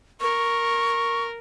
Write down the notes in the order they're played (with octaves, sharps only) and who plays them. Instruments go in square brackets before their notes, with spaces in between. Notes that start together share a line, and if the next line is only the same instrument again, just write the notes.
[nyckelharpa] A#4 [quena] C#6